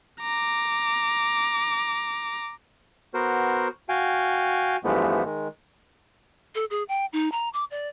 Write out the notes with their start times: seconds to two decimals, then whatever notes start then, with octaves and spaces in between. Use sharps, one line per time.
0.21 A#5 D6
3.14 B3 F#4 A#4 C5
3.89 F#4 F5 G5 G#5
4.84 G2 E3 F3 G#3 A3 B3
5.25 D#3 G#3
6.55 A4
6.70 G#4
6.88 G5
7.13 D#4
7.32 A#5
7.53 D6
7.71 D5